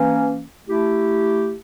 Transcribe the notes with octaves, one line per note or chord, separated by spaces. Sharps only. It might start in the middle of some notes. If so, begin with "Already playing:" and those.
Already playing: E3 A#3 C#4
A3 E4 G4